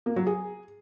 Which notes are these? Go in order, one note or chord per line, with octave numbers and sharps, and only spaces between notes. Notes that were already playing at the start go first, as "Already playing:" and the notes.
A#3
F#3
G#4